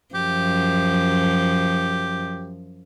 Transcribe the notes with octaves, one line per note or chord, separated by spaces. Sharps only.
F#2 F3 G4